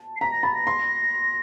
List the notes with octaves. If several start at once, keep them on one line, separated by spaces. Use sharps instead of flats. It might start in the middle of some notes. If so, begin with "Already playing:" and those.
Already playing: A5
C7
A#5 B6
A#6
B5 A6
A#6
C6